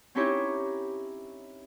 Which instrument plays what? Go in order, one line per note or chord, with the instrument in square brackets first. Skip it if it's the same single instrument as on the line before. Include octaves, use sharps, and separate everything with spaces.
[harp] C4 C#4 D#4 E4 G4 C#5